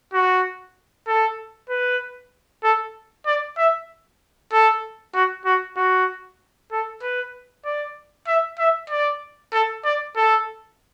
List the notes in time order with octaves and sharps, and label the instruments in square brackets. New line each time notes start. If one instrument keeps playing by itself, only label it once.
[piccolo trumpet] F#4
A4
B4
A4
D5
E5
A4
F#4
F#4
F#4
A4
B4
D5
E5
E5
D5
A4
D5
A4